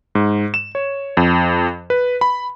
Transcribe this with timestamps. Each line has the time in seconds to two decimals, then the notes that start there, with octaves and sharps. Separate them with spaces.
0.15 G#2
0.54 E7
0.75 C#5
1.17 F2
1.90 B4
2.21 B5